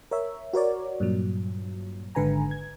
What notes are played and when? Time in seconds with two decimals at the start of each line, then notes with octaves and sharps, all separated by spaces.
0.11 A#4 C#5 E5
0.53 F#4 A#4 C#5 D5
1.00 G2 A#2 F#3
2.15 G#1 G#2 D3 B4 G#5 A#5
2.51 G#6